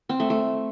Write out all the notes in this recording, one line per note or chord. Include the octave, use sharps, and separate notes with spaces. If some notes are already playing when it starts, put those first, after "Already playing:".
C4
A3
A3